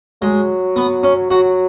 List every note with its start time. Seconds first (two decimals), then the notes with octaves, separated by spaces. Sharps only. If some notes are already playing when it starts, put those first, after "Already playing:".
0.22 F#3 G#3
0.76 B3
1.03 C#4
1.31 F#3 F#4